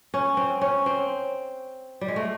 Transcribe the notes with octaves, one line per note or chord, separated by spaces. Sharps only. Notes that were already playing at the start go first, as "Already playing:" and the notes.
C#4
C4
C#4
C4
G3
G#3
A3